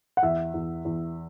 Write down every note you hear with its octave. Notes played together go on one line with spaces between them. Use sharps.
F#5
E2 E5
E2
E2